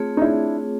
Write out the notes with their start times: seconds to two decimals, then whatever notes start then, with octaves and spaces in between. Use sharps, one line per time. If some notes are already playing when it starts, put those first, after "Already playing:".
Already playing: A3 C4 F4 G#4 C#5
0.17 D#4
0.22 D4 E4